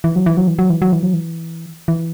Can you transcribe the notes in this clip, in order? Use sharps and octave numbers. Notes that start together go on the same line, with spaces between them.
E3
F#3
E3
F#3
E3
F#3
E3
F#3
E3
F#3
E3
E3